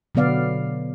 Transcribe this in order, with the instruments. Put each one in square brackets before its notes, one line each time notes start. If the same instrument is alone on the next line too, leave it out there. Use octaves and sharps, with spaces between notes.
[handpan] B2 D3 F#3 B3 D5 F5